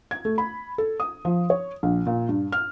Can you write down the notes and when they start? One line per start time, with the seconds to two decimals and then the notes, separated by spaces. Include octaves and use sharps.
0.11 G#6
0.25 A3
0.38 B5
0.78 A4
1.00 D#6
1.25 F3
1.50 C#5
1.83 A#1
2.07 A#2
2.29 G2
2.52 F6